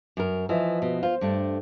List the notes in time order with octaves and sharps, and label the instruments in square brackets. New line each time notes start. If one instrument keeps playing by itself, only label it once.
[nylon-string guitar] F#2 A#4
[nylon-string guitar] E3 [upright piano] F3 D#5 E5
[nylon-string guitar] B2
[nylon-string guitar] F4 [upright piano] C5
[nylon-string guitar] G2 A3 D4